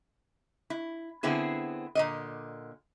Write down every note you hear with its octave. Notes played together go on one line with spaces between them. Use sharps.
E4
D3 B3 C4 E4 G#4
A#2 D3 D#5